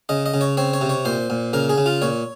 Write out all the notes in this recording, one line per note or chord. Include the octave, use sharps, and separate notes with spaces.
C#3 D#5
D#5
C#3
C#5
C4 C#5
C#5
C3
C#5
A#2 C5
A#2
C#3 A#4
G#4
C#3
F4
A#2 C#5